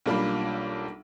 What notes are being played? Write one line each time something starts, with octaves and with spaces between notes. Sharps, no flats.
B1 G3 A#3 D4 F4 B5